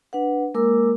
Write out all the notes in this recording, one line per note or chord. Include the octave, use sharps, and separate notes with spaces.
D4 B4 F#5
G#3 A#3 A#4 D6 E6